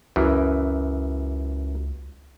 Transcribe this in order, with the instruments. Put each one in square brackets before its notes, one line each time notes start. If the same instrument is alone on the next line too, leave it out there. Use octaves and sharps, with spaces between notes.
[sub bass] C#2 [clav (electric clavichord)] F#2 C#3 E3